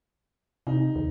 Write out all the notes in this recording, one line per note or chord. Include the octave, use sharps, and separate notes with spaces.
C3 D#4
D#2